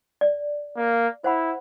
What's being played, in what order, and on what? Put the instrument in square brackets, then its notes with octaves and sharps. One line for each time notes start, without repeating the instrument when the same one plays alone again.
[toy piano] D5
[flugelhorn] A#3
[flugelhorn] E4 [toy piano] C5 F#5 B5